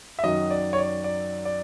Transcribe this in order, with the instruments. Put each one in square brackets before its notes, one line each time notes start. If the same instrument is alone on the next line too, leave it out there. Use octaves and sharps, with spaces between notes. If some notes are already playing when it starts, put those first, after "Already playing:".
[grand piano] E5
F#2 D#3 F#3 D#5
D5
C#5
D5
D5
D5